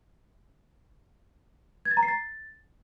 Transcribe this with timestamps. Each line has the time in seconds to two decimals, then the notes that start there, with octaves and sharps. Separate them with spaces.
1.85 G#6
1.91 A6
1.97 A#5
2.03 C7
2.08 A6